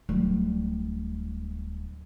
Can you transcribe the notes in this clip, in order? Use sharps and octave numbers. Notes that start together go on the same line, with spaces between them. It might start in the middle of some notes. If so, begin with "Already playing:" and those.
D1 G3